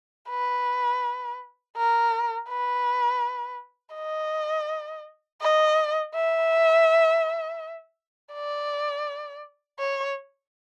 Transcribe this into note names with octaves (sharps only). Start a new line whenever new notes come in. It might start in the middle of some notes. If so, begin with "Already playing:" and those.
B4
A#4
B4
D#5
D#5
E5
D5
C#5